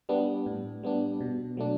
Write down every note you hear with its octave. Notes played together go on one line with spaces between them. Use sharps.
G3 B3 D4
A2
G3 B3 D4
B2
F#3 A3 D4